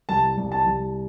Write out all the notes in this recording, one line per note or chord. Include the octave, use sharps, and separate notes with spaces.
C2 A5
C2
A5
C2